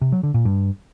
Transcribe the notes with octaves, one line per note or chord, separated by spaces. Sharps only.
C3
F#3
D3
A#2
G2